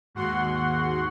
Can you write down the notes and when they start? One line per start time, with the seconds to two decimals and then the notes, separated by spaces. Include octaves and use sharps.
0.15 D#2 G#2 F#4 F#5 C6